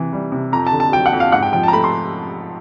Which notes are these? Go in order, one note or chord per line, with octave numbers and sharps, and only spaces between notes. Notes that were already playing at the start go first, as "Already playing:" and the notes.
Already playing: C3 E3
G3
C3
F2 A#5
A5
D3
A5
F#3 G5
F#5
F2
F5
G#2 F#5
G5
F3 G5
A5
A#5
A3 B5
C6